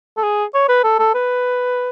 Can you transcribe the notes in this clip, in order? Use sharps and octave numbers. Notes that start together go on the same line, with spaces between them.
A4
G#4
C#5
B4
A4
A4
B4